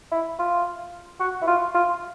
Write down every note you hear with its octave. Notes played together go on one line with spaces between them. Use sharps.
E4
F4
F#4
E4
F4
F4